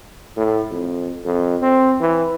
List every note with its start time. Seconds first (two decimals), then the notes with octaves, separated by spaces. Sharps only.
0.37 A2
0.71 F2
1.25 F2
1.62 C4
2.01 E3